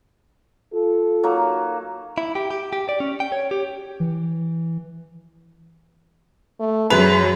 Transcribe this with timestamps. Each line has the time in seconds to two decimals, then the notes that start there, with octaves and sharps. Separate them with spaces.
0.72 F4 A4
1.23 F#3 A#3 D#4
2.18 E4
2.35 G4
2.51 G4
2.73 G4
2.89 D5
3.00 C#4
3.20 G5
3.32 C#5
3.51 G4
4.00 E3
6.60 A3
6.90 F#2 F#3 G#4 B4 F7